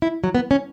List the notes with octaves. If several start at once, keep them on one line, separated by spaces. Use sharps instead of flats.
E4
F#3
B3
C#4